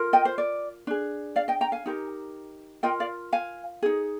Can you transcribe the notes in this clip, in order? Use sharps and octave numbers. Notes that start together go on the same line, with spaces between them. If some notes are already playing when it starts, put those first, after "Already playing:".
Already playing: F4 A#4
D#5 G5
C5
D5
D4 G#4
D5 F5
D#5 G5
G5 A#5
F5 G#5
D#4 G4 A#4
F4 A#4 D#5 G5
D5 F5
F5 G#5
D#4 G#4